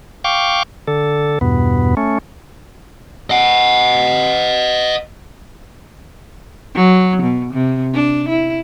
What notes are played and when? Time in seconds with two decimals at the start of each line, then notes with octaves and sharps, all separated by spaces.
0.24 F5 G5 C#6 D6
0.88 D3 A4
1.41 E2 G2 B2 B3
1.97 A3 C#4
3.30 D#5 F#5
6.75 F#3
7.23 B2
7.53 C3
7.94 D4
8.29 E4